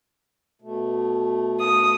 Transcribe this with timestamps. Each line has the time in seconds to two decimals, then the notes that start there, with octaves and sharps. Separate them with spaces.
0.62 B2 A3
1.60 D#6